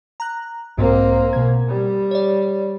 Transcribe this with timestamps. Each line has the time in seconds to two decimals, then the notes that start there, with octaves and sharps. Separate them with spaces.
0.20 A#5 F#6
0.78 B1 G#2 A#3 C4
1.33 B2 G#6
1.68 G3
2.11 C#5 D5